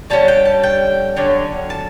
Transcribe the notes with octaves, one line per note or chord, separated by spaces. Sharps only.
D3 G3 C#4 A5
G5
A5
G5
D3 F#3 C#4
A5